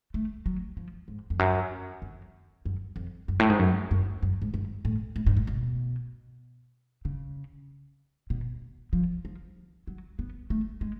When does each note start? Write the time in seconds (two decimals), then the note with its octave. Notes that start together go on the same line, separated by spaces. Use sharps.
0.14 A3
0.46 F#3
0.77 F3
1.08 G#2
1.30 F2
1.39 F#2
2.02 F2
2.66 F#2
2.96 F2
3.28 F#2
3.40 A2
3.50 G#2
3.59 F#2
3.91 F#2
4.23 F#2
4.42 G#2
4.54 F#2
4.85 A2
5.16 A2
5.26 G#2
5.37 A2
5.47 B2
7.05 C#3
8.30 B2
8.93 F3
9.25 F3
9.87 F#3
10.19 B3
10.50 A3
10.81 G#3